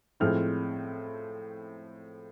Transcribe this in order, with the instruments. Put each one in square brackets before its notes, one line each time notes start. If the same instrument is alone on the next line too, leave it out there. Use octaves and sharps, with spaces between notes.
[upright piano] A2 F3 G#3 C4 E4 F6